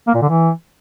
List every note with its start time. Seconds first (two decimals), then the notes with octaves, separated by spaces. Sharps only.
0.07 A#3
0.15 A#2
0.22 D3
0.29 E3